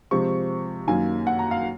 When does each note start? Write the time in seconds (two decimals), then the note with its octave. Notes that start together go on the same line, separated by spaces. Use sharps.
0.11 C3 F3 G#3 C4 C#6
0.87 F#2 D#3 A#3 G#5
1.27 F#5
1.39 A#5
1.51 F5